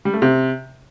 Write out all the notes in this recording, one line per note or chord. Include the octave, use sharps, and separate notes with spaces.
G3
A3
C3